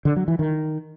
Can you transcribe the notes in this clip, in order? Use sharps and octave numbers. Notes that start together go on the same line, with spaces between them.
D3
F#3
E3
D#3